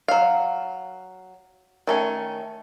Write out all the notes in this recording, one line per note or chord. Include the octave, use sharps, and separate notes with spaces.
F#3 F5
D#3 A3 C#4